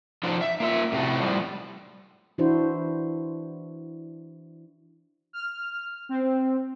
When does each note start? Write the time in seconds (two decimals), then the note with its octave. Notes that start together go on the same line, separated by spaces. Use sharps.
0.23 F3 F#3 D4 D#4 F4
0.41 E5
0.60 A#3 F4 E5
0.92 A2 C3 A3 F#4
1.20 A2 F3 G3
2.38 E3 D4 E4 F#4 C5
5.33 F6
6.09 C4